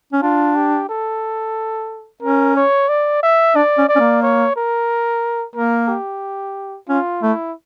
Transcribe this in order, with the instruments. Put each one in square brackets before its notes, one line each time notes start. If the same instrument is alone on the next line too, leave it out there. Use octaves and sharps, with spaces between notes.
[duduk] C#4
[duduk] D4 [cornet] F4
[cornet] G4
A4
[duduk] C#4 [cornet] A#4
[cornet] C#5
D5
E5
[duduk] D4 [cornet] D5
[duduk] C#4
[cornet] D5
[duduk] C#4
A#3
[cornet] C#5
A#4
[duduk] A#3 [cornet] A#4
[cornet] G4
[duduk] C#4 [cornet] F4
[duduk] A3 [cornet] E4